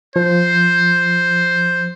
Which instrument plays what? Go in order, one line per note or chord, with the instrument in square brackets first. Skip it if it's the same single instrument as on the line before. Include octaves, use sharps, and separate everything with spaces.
[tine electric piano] F3 [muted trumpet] C5